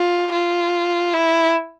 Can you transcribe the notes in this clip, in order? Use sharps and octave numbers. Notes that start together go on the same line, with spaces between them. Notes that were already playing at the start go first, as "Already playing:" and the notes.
Already playing: F4
F4
E4